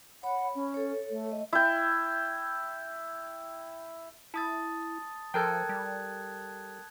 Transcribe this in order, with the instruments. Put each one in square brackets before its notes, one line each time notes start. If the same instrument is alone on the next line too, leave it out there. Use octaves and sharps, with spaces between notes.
[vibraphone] C#5 B5 [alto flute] F#5
[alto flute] C#4
[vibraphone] A4 C#5
[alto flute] A3
[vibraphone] D#5
[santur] E4 G5
[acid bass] E4 [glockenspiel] A5 D#6 A6
[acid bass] F3 [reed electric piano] A4 A#4 G5 [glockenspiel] A5 F#6 G#6
[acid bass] G3